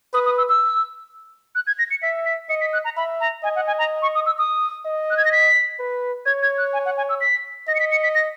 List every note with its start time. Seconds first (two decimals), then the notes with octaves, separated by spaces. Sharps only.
0.14 B4 D#6
0.26 D#6
0.38 E6
0.49 E6
1.55 F#6
1.67 G#6
1.79 A#6
1.91 C#7
2.02 E5 B6
2.26 B6
2.49 D#5 C#7
2.61 B6
2.73 F#6
2.85 A#5
2.96 E5 B5
3.20 A#5
3.44 D#5 G#5
3.56 F#5
3.67 G#5
3.78 A#5
4.02 C#6
4.15 D#6
4.26 E6
4.38 D#6
4.85 D#5
5.10 F#6
5.17 G#6
5.25 A#6
5.32 B6
5.79 B4
6.26 C#5 G#6
6.42 G#6
6.58 F#6
6.73 G#5
6.85 F#5
6.97 G#5
7.09 E6
7.21 B6
7.68 D#5 A#6
7.75 C#7
7.80 B6
7.91 C#7
8.03 B6
8.15 A#6